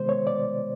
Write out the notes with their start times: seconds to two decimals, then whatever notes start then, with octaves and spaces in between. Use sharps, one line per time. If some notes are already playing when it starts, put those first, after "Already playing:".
Already playing: C3 D#3 G#3 B3 C5
0.09 C#5
0.27 D5